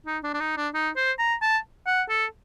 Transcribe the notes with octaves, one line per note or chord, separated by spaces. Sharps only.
D#4
D4
D4
D#4
D4
D#4
C5
A#5
A5
F#5
A4